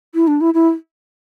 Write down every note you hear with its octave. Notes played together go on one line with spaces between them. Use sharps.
E4
D4
E4
E4